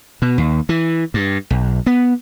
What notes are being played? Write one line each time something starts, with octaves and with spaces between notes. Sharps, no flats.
B2
D#2
E3
G2
B1
B3